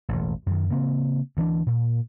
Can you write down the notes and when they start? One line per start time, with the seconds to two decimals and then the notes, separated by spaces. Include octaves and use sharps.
0.09 E1 A1
0.46 F#2 D#3
0.70 C#3 A#3 C4
1.37 D2 E3 C4 D4
1.66 A#2